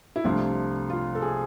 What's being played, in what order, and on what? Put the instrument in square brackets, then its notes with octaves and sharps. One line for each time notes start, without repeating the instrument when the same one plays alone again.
[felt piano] E4
C2 C3 F3 A3 D4 F4
F4
A4
G#4